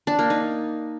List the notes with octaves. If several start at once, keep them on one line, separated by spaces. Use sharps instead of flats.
D4
A#3
D#4